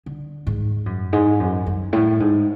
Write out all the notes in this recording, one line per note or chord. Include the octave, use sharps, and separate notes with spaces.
D3
G#2
F#2
G#2
F#2
F#2
A2
G#2